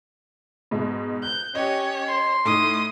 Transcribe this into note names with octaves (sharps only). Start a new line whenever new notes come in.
G#2 B2
F#6 G6
C#4 G4 C#5 D#5
C6
A2 D#4 D#6